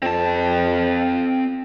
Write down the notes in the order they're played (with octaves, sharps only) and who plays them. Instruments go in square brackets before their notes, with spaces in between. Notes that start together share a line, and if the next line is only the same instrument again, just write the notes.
[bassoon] F2 [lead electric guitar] C4 A5